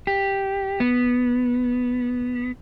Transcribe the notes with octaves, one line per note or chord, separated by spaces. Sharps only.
G4
B3